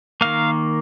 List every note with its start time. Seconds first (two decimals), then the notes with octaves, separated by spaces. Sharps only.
0.21 D#3 A#3 F5